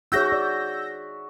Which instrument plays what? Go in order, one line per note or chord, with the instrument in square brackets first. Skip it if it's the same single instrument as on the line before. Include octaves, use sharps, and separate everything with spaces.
[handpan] D#4 G#4 C#5 [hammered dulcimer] F#4 E5 [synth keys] E6 G6 A#6
[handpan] D5